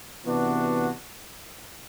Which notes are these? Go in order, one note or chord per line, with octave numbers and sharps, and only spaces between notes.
C3 E3 B3 D4 F#4